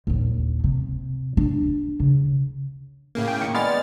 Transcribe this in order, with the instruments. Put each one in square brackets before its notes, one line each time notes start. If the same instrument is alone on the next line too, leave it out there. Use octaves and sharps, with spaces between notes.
[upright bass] A#1 D#2
C3
D4
C#3
[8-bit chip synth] A2 C#3 A#3
[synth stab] G5
D#3 C#7
[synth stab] G#3 B3 D5 [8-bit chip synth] F6 A6